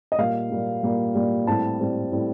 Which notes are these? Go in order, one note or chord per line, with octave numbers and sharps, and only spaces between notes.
D#5
A#2 G3 A#3 F5
A#2 G3 A#3
A#2 G3 A#3
A#2 G3 A#3
A2 G3 C4 A5
A2 G3 C4
A2 G3 C4